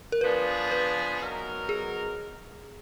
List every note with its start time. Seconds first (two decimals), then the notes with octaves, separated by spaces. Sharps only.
0.12 A#4
0.21 F3 B3 D4 G#4 B4
0.72 B4
1.20 F#3 B3 D#4 A#4
1.69 G#4